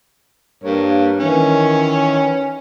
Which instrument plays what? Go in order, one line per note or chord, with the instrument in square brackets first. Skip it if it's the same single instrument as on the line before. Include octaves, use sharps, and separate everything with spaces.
[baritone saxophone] G2 [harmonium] A#3 A#4 C#5
[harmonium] D#3 E3 C#5 [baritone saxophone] C#4